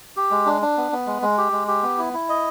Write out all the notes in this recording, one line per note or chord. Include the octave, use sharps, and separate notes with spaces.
G4
G#3
D4
D4
B3
B3
G#3
G#3
G4
G#3
G4
B3
E4
E4
D#5